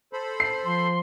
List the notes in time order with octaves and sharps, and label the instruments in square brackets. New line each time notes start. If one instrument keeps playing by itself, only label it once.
[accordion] A4 C5 B5
[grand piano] C7
[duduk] F3 [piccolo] C6